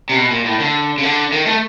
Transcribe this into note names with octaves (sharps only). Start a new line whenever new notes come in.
C3
B2
A#2
A2
D3
C#3
D3
D#3
A3